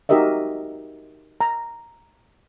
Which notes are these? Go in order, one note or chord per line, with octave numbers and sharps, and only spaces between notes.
D#4 F#4 G4 A#4 D#5 E5
A#5